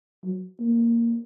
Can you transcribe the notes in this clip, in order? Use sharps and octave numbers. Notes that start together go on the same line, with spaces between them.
F#3
A#3